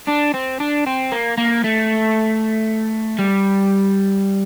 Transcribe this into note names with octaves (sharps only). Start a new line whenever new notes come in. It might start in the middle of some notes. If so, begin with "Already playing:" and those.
D4
C4
D4
C4
A#3
A#3
A3
G3